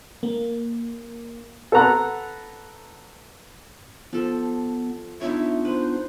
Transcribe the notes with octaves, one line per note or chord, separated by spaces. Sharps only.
A#3
A4 B4 F#5 A#5 F#6
F3 B3 A4
B3 D4 D#4 F4 C#5 E5
B4 C5